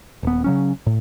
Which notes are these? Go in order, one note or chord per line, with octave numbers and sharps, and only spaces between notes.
D#1 B3
C#3 F#3 C#4
A2